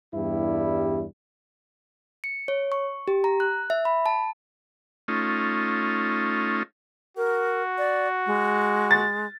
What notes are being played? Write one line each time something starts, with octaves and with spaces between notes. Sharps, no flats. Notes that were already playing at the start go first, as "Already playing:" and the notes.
E2 G2 G3 E4
C#7
C#5
C#6
G4
A#5
F#6
E5
B5
A5
A3 C#4 D#4 F4
F#4 A#4
D5
G#3
A6